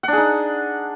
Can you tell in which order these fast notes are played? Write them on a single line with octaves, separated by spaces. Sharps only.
F#5 D4 G#4 D#4